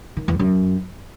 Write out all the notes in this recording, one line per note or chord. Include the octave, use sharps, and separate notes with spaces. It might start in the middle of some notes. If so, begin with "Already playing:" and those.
D#3
E2
F#2